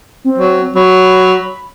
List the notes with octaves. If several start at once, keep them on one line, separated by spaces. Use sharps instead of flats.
C4
F#3
F#3 B5